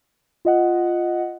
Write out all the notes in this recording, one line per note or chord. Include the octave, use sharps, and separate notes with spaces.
F4 D#5 F#5